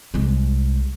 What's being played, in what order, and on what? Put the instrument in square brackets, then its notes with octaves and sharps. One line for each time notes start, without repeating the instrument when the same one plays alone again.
[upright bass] C2 G#3